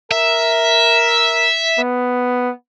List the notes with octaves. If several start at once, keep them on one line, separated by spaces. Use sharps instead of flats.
A#4 E5
B3